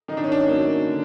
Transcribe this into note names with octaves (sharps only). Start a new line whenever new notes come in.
D#3 D#4
D4
C#4
D4
F#3 A#3
D3